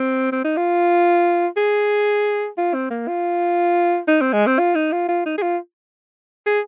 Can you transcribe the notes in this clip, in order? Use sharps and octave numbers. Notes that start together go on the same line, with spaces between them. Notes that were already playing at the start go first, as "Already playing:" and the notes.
Already playing: C4
C4
D#4
F4
G#4
F4
C4
A#3
F4
D#4
C4
G#3
C4
F4
D#4
F4
F4
D#4
G#4
F4
G#4